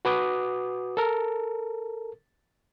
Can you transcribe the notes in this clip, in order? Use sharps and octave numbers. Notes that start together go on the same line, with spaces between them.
F#4 B4 D6 D#6
A4 A#4